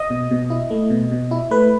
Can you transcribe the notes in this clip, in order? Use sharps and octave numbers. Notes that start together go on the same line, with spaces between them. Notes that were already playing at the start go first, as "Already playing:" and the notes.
Already playing: D#5
B2
B2
E4
A3
B2
B2
E4
A3 B4